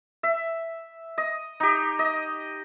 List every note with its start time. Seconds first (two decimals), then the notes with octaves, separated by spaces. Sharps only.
0.23 E5
1.18 D#5
1.60 D#4 G4
1.99 D#5